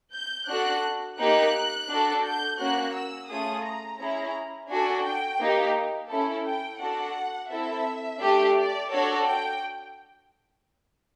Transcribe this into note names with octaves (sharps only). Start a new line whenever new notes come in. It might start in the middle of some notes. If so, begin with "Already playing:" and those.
G6
D4 F#4 A4 F#6
A#3 D#4 G4 F#6
D4 F#4 A4
G6
A#3 C#4 F#4 F#6
E6
A3 C#4 F4 G#4 D#6
A#5
C#4 E4 G#4 A#5
D4 F#4 A4 G#5
G5
A#3 D#4 G4
C#4 E4 A4
G5
D4 F#4 A4 F#5
C4 E4 A4 E5
A3 D4 G4
D5
D4 F#4 A4 C#5
G5